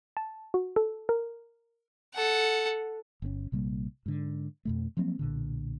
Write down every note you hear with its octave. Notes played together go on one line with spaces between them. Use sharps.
A5
F#4
A4
A#4
A4 F#5
G1 B2 C#4
A#1 C3 G3 A#3
G#2 D3
F2 B2 A3
F3 F#3 A#3 C4
B1 A#2 D3